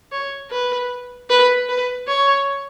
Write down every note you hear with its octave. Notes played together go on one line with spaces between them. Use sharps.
C#5
B4
B4
B4
C#5